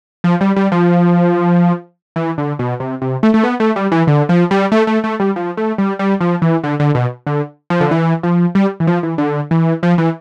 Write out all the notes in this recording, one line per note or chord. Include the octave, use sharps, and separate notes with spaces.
F3
G3
G3
F3
E3
D3
B2
C3
C3
A3
A3
B3
A3
G3
E3
D3
F3
G3
A3
A3
A3
G3
F3
A3
G3
G3
F3
E3
D3
D3
B2
D3
F3
D3
E3
F3
G3
E3
F3
E3
D3
E3
F3
E3